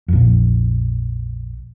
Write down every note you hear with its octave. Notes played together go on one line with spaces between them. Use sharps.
A#1 F2